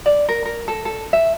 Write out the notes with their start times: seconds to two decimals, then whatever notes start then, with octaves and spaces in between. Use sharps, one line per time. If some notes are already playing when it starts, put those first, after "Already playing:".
0.06 D5
0.29 A#4
0.45 A#4
0.68 A4
0.85 A4
1.13 E5